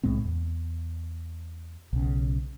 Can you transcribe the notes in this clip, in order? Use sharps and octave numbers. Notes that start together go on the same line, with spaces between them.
C2 A2 G#3 C4
E2
B1 C#3